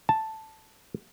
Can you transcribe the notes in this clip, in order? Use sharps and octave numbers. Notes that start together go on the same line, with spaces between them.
A5